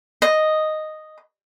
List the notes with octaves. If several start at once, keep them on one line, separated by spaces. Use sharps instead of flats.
D#5